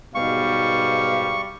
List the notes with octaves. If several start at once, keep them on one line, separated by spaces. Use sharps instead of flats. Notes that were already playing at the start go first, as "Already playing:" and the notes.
G#2 B2 G3 F5 C#6